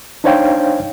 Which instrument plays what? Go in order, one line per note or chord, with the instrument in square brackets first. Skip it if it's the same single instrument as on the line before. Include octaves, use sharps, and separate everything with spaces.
[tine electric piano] D4 D#4 C5 C#5 F5 G5